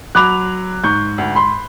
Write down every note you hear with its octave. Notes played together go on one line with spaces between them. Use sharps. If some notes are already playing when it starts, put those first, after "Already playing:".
F#3 B5 D6 F#6 F7
G#2 C#6 G6
D2
B5 C6